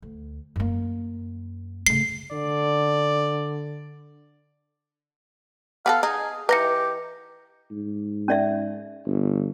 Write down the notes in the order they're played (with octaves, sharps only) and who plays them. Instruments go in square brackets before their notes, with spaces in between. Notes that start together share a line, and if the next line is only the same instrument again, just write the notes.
[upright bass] D2
F#2 A#3
[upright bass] C#3 A3 [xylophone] C7
[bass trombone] D3 [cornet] D5
[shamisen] B3 G#4 A4 [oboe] F5
[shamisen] D#4 [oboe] G#4
[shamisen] E3 D#4 [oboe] G4 [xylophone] B4 A#6 C#7
[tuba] G#2
[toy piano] C#4 D5 E5
[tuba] G1